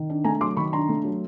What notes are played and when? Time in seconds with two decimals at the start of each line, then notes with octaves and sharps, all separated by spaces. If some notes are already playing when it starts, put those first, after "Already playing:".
Already playing: D#3
0.10 D4
0.24 A3 G#5 A#5
0.41 F#3 C6 D6
0.56 D#3 B5 C#6
0.73 D4 A#5 C6
0.89 A3
1.04 F#3